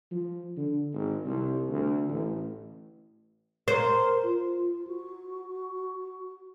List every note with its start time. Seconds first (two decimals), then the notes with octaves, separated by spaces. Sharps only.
0.11 F3
0.57 D3
0.94 G#1
1.25 C2
1.69 D2
2.09 A1
3.68 A#4 C5
4.23 F4
4.87 F#4